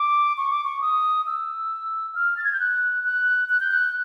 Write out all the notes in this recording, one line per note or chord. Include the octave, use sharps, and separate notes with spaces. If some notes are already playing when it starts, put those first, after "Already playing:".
Already playing: D6
C#6
D6
C#6
D#6
E6
F6
A6
G#6
G6
F#6
F#6
F#6
G6
F#6